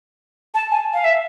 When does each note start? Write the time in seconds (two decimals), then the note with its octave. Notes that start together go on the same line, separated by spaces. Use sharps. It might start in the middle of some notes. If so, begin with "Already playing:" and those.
0.55 A5
0.71 G#5
0.94 F5
1.04 E5